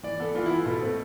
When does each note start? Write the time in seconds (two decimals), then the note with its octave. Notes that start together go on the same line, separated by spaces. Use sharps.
0.03 E3 D5
0.20 B3 A4
0.35 E3 F4
0.46 B3 E4
0.56 F4
0.66 B2 A4
0.82 A3 C4